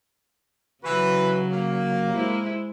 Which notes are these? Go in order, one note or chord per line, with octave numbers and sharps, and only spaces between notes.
C#3 E3 F#3 F#4 B4
A#3
G#3 E4 C5